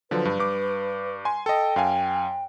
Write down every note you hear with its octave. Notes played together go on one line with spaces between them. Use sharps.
D3 F3 F#3 B4
G2
G2 D6
G#5 C6
A4 D#5 G5
F#2 F5 G#5